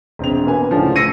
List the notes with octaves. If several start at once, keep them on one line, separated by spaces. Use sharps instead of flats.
E1 C4 F7
A#3 B3 G#5
C#2 A2 D3 F3
E6 A#6 C7 C#7 D#7